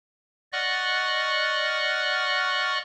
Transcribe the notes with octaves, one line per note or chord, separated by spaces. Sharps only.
D5 D#5 F#5 C#6 F6 F#6